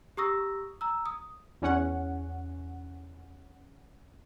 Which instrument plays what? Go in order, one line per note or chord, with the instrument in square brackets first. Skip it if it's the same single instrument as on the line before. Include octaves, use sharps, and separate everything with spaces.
[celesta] G4 A#5 C#6 D#6 E6 A#6
A#5 E6
D#6
[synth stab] E2 C#4 F#5